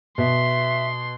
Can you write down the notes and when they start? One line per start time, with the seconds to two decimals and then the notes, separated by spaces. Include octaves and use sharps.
0.18 B2 E5 C6